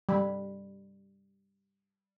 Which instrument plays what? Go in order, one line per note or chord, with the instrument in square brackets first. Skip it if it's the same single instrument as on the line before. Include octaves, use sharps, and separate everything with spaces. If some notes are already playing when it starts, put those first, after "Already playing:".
[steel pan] G3 B5